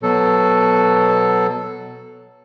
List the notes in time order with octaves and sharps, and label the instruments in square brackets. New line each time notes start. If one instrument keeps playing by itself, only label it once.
[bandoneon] B2 F#3 A4